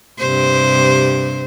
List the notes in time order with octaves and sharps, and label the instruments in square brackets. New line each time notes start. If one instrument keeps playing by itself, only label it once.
[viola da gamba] G2 C3 C5